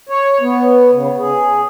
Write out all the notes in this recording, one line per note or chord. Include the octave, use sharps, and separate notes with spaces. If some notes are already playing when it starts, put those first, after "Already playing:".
C#5
B3
C#3
G#4